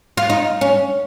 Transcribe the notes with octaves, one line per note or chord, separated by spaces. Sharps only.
F4
D#4
C#4